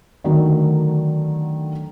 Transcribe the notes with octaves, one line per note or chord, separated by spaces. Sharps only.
D3 D#3 F#3 A3